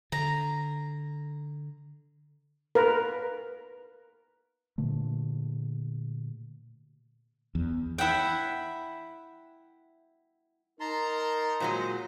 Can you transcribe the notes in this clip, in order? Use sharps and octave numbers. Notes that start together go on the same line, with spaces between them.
D3 A#5
A#4 B4
A#2 D3 A3
E2
E4 E5 F#5 G5
D#4 A#4 A5 A#5 C6
A#2 F#3 G#3 C5